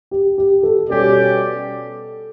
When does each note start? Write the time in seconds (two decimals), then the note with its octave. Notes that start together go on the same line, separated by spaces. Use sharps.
0.11 G4
0.38 G4
0.63 A4
0.89 B2 G3 C#4 G4 A4 D5